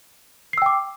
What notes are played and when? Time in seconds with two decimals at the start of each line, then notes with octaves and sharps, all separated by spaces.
0.53 C7
0.58 E6
0.62 G5
0.66 D6